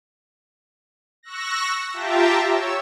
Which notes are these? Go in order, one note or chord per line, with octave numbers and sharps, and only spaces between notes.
C#6 E6 F#6 A#6
F4 G4 E5 G5 A5 A#5
C#5 E6